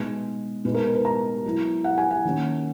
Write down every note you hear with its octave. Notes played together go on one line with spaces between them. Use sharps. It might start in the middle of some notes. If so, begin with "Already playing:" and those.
Already playing: B2 G#3 D#4
B2 G#3 D#4 B4
A#4
B4
B4
A#5
F#3 B3 E4
F#5
G#5
F#5
D#3 A#3 C#4